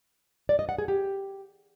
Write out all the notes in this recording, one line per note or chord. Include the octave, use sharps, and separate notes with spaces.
D5
D#5
F#5
G#4
G4